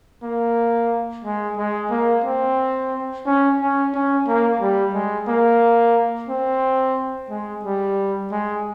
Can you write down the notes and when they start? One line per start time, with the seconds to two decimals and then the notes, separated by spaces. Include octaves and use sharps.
0.23 A#3
1.24 G#3
1.58 G#3
1.91 A#3
2.24 C4
3.26 C#4
3.60 C#4
3.94 C#4
4.27 A#3
4.61 G3
4.94 G#3
5.28 A#3
6.29 C4
7.30 G#3
7.65 G3
8.32 G#3